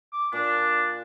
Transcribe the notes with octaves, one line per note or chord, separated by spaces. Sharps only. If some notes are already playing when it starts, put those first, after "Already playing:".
D6
A#2 D4